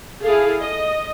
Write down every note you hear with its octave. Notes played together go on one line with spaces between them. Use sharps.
E4 G#4 A4 F5
D#5